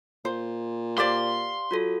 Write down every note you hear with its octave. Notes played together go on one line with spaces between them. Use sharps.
A#2 C5
G4 C5 D5 F5 C6
F#3 F4 F#4 A4